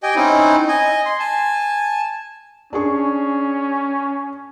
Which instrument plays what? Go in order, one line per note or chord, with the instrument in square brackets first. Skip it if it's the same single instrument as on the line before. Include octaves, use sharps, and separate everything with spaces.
[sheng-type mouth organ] G4 D#5 G5 G#5
C4 C#4 D#4 E4
D#5 G#5
C6
G#5 A5
[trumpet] C#4 [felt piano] D4 G#4 C#6